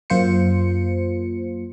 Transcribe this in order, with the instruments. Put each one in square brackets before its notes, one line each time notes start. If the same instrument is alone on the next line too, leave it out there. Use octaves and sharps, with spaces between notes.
[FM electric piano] F#2 A#3 F4 C5 C#7